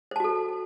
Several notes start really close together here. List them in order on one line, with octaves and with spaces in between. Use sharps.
C5 A5 F#4 A4